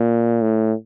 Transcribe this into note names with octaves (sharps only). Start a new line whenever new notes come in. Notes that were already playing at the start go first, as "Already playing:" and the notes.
Already playing: A#2
A2